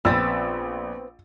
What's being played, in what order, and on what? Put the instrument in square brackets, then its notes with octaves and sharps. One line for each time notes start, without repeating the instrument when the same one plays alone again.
[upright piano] A#1 [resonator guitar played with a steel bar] B3 C4 B4 [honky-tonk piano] E6 A6